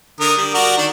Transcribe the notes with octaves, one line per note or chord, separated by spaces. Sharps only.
D3 A#4 D#6
G3
F#4 A#4 D5
D#3 D4